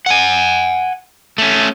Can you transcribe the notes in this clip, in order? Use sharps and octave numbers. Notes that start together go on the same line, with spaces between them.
F#5 G#5
A3 C#4